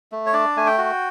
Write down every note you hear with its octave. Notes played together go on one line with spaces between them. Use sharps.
A3
C#5
D4 D5
A3 G#5
G5
F#4